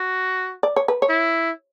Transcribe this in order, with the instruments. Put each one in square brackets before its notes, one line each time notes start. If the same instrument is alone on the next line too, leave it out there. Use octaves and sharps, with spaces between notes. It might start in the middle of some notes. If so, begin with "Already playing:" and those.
Already playing: [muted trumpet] F#4
[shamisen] D5
C#5
B4
C#5
[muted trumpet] E4